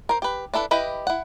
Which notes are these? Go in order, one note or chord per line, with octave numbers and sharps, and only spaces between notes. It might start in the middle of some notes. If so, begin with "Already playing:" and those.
A#4 C5
G4 B4
D4 E4 A4 B4
E4 G4 B4 D#5
E4 F#5